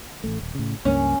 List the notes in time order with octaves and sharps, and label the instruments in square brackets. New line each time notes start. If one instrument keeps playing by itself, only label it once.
[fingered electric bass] A1 A#2 A3
D#1
A2 C#3
[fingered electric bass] C#2 G2 A#3 [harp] C#4